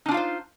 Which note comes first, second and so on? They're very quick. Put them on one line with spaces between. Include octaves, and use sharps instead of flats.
D#4 D4 F4 F5 C5